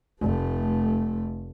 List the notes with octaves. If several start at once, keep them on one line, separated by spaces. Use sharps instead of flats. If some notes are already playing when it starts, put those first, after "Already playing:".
F1 A3